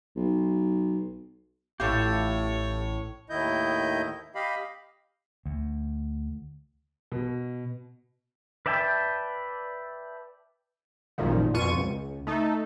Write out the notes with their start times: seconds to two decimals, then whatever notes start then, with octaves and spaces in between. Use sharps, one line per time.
0.16 B1
1.80 A1 A2 F4 G4 A4 C#5
3.30 D#2 A2 D#3 E4 D#5 G6
4.35 G4 D#5 F5 B5
5.46 D2
7.12 B2
8.66 B4 D5 E5 G5 A5
11.18 A1 F#2 A#2 D#3 F3
11.54 F2 B2 F4 C#6 D#7
11.73 C#2
12.27 A3 D#4 A4